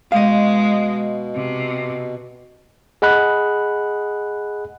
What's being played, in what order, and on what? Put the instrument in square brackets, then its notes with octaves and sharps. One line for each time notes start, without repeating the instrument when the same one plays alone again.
[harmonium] B2 [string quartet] G#3 [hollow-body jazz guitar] D#5 F5
[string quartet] C3
[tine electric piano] G#4 D#5 F#5 B5 F#6